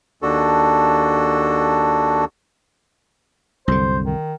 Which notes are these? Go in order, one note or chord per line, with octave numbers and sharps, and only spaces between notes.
D#2 D4 F#4 A4
C2 F#2 D3 C5
D#3